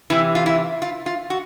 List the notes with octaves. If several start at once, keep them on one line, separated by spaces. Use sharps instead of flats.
C3 E3 E4
F4
E4
F4
F4
F#4